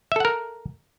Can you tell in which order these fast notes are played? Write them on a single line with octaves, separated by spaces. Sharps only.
E5 A4 F#5 A#4